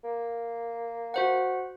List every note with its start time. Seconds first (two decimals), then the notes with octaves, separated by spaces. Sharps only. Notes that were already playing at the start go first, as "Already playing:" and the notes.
0.04 A#3
1.14 F#4 C5 F#5